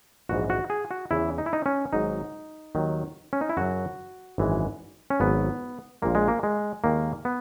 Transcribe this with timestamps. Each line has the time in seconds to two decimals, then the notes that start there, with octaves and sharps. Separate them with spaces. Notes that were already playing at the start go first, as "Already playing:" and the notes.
0.29 A#1 G#2 E3 G#3 F#4
0.50 F#4
0.70 G#4
0.91 F#4
1.11 E2 C#3 E3 E4
1.38 D#4
1.46 E4
1.53 D#4
1.66 C#4
1.93 G#1 G#2 F#3 D#4
2.75 D#2 D#3 F#3
3.33 C#4
3.41 D#4
3.49 E4
3.57 F#2 C#3 F#3 F#4
4.38 G#1 F#2 E3 G#3
5.10 C#4
5.20 G#1 G#2 F#3 B3
6.02 A#1 A#2 G#3 A#3
6.15 G#3
6.28 A#3
6.43 G#3
6.84 D#2 D#3 G#3 A#3
7.25 B3